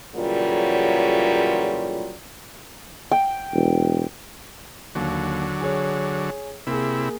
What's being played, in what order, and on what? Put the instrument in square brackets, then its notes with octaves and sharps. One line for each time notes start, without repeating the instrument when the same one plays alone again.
[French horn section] E2 A#2 C#3 F#3 G3 F4
[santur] G5
[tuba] E1
[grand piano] D#2 [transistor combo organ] D3 F#3
[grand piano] G#4 C#5
[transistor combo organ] C3 E4 [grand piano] A#3 G#4